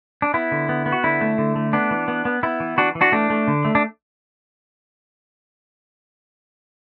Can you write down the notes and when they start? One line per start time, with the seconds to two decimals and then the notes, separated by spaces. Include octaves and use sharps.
0.22 D4
0.34 B3 E4
0.52 D3
0.69 B3
0.86 B3
0.92 F#4
1.04 D3 E4
1.21 A3
1.38 D3
1.56 A3
1.73 B3 D4
1.91 E3
2.08 B3
2.25 B3
2.43 B3 E4
2.60 E3
2.78 E3 D4 F#4
2.95 E3
3.01 D4 F#4
3.12 A3 D4
3.30 A3
3.48 D3
3.65 A3
3.75 D4